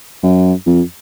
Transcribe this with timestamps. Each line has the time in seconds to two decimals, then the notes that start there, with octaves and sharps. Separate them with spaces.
0.23 F#2
0.67 F2